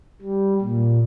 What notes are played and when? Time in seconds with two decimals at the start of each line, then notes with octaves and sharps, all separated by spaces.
0.21 G3
0.61 A#2